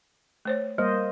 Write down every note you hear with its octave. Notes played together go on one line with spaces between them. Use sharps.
A3 C5 C#5
G3 A#3 C5 D#5